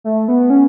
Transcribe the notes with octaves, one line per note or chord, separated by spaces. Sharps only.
A3
B3
C#4